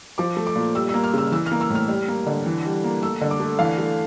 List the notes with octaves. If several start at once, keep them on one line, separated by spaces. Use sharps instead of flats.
F3 D6
A3
D6
A#2
G3 E6
E6
A#3
F6
C#3 E6
E3 E6
F6
A#3
E6
A2
F6
G3
A#3
D3
E3
G3
A#3
A3 E6
D3
D6
A3
E3 F5
A3